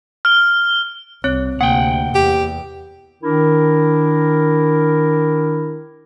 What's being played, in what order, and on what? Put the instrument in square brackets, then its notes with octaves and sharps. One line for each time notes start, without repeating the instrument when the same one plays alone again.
[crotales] F6 G7
[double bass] C2 [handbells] C4 C#5 F#6
[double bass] D2 C3 [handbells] A#3 [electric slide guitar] F#5 G5
[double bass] E2 [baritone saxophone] G4
[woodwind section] D#3 D4 E4 A#4